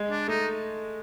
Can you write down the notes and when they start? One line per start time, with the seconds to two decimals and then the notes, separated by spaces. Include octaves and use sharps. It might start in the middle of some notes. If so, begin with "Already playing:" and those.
Already playing: G#3
0.11 D4
0.28 A3 D#4